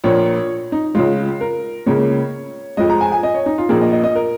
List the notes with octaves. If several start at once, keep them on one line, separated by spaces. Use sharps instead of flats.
A#1 A#2 A#3 C#5
D#4
C#2 C#3 G#3 F4
A#4
C#2 C#3 A#3 C#5
F2 F3 G#3 D#5
A#5
G#5
G#5
D#5
C#5
D#4
F4
A#1 A#2 A#3 G#4
D#5
D#5
D#5
A#4